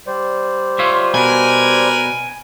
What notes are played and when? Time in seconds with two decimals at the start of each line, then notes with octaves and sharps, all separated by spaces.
0.07 G3 C5 D5
0.79 F4 C#5 E5
1.14 B2 A#4 B4 G#5